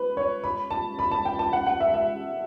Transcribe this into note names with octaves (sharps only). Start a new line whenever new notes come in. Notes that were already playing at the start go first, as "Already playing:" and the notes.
Already playing: B4
C#5
B5
A5
B5
A5
G5
A5
F#5
F#5
E5
E5